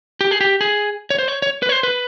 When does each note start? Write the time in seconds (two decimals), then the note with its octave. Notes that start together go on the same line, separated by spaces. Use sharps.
0.21 G4
0.31 G#4
0.41 G4
0.61 G#4
1.10 C#5
1.19 C5
1.28 C#5
1.42 C#5
1.62 B4
1.69 C#5
1.72 C5
1.83 B4